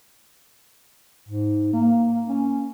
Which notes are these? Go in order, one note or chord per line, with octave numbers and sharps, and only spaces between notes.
G#2
A#3
C#4